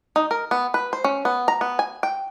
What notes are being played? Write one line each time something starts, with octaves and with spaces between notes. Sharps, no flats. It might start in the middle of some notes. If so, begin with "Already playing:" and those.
D#4
A#4
B3
B4
C5
C#4
B3
A#5
B3
G#5
G5